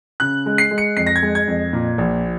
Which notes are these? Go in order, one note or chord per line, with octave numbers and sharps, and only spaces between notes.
C#3 F#6
G#3
C7
G#3
C#7
F2 C7
A#6
G#6
G#3
G#6
F2
A#2
A#1